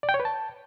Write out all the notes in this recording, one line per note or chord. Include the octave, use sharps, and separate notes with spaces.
D5
G5
C#5
B4
A5